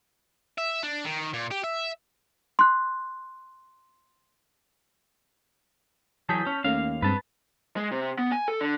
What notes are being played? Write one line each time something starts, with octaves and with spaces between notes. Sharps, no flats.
E5
D4
D#3
A#2
G4
E5
C6 F#6
E3 F#3 G#4 A5 G6 B6
C#4
D#2 A3 A#3 C#4 F5
G2 G#3 C4 B4 A5
G#3
C3
B3
G#5
A4
D3